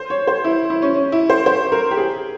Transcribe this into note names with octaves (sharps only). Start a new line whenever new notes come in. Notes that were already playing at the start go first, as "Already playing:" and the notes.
Already playing: C5
C#5
C5
E4
E4
C#4
C#4
E4
C5
C5
A#4
G4
G#4